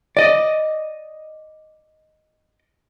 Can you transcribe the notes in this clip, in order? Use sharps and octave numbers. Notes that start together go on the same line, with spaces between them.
D5 D#5